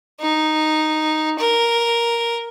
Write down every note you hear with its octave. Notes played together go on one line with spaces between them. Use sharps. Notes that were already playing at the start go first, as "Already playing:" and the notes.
D#4
A#4